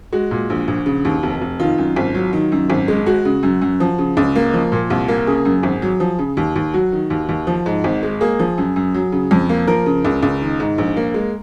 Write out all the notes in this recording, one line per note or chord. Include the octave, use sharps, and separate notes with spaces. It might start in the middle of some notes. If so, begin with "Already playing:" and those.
G#3 F#4
A#2
A#1
A#1
C#3
D#2
F1
F1
D#3 F4
F#2
G#1
F#3
D#3
F#2
G#1
G#3
G#3 F#4
C#3
F#2
F#2
F3
C#3
C#2
A#3
F3
A#2
C2
A#3
C#3 G#4
F#2
G#1
F#3
F3
C#3
D#2
D#2
F#3 F#4
D#3
D#2
D#2
F3
G#2
G#1
G#3
A#3 G#4
F3
F#2
F#2
F#3
C#3
F2
A#3
F3 A#4
C#3
C#2
C#2
D#3
G#2
A#1
A#3
G#3